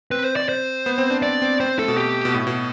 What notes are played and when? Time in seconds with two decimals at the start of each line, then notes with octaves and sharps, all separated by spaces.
0.11 C4 B4
0.24 C5
0.36 D5
0.49 C5
0.86 B3
0.98 C4
1.11 D4
1.22 C4 D5
1.42 C4
1.60 C4 C5
1.79 A3 A4
1.88 B2
1.97 G4
2.25 B2
2.34 A2
2.47 B2